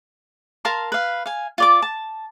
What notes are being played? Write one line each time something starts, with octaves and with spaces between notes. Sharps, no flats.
A#4 F5 A5 C6
B4 F5
F5 G#5
F4 D5 D6
A5